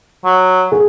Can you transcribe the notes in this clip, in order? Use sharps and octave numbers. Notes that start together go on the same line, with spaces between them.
F#3
G#4